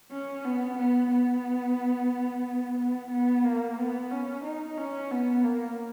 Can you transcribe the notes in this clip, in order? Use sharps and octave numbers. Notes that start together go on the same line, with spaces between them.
C#4
B3
B3
B3
B3
B3
A#3
B3
C#4
D#4
C#4
B3
A#3